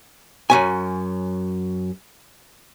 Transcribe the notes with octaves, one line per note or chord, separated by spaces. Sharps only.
F#2 C#4 G#5